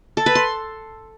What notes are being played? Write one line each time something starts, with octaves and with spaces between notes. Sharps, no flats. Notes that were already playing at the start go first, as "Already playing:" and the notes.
A4
B4
C6